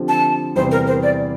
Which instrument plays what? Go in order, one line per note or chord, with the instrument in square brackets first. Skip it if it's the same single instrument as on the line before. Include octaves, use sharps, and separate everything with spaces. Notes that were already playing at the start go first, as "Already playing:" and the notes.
Already playing: [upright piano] D3 F3 C4 G4
[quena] A5
[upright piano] E2 C3 E3 G3 C4 [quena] C5
[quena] A#4
C5
D5